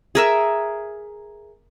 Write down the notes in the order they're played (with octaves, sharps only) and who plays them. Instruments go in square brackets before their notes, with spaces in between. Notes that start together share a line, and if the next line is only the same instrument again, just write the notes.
[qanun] G#4 A#4 E5